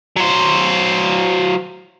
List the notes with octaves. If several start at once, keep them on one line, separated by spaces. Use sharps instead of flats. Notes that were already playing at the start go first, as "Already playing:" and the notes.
F#3 C5